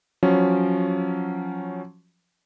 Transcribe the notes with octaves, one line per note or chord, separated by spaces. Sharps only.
F3 F#3 C#4